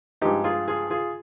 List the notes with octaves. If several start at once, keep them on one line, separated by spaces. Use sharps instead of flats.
G2 F3 G#3 D#4 G4
F4 G#4
F4 G#4
F4 G#4